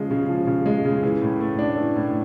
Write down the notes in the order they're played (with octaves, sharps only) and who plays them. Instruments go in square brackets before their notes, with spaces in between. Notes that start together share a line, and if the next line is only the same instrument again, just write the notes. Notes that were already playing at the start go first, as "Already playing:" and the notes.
Already playing: [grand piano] C#3 F3 G#3
C#3
F3
C#3
G#3
C#3
E3
A2
A3
D4
E3
A2